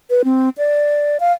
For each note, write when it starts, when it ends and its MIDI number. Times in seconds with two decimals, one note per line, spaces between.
0.10 0.22 71
0.24 0.49 60
0.58 1.17 74
1.20 1.32 77